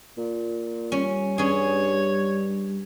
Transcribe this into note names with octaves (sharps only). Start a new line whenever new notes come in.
A#2
G3 C#4
G2 C#4 G#4 C#5